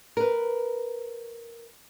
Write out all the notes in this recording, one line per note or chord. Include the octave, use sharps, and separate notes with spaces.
A#4 B4